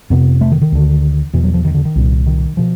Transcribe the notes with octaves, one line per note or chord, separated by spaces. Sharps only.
F2 C3 B3
A3
D#3
D#3
D2 D3
E2 B2 E3
F#3
F3
D#3
D3
D#3
C2 A#2
D#3
B2 F3